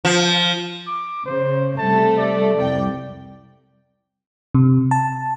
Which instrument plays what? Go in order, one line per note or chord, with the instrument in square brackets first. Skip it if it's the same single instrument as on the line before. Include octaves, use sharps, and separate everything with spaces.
[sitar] F3
[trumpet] D6
[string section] C#3 [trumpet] C5
[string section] C3 G3 A3 [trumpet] A5
[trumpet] D5
[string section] C2 F2 G5
[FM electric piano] C3
A5